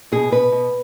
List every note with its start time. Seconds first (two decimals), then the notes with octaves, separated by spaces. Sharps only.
0.12 B2 G#4
0.31 B2 B4
0.52 B2